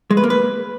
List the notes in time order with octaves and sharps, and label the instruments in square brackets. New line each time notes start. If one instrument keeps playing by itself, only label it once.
[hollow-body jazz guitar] G#3
B4
A#3
B4